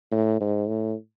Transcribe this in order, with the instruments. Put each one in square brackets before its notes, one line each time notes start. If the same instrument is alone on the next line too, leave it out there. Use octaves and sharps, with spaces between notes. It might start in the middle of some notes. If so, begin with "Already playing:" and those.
[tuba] A2
G#2
A2